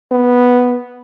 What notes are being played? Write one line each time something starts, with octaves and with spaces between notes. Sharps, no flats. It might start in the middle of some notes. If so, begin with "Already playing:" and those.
B3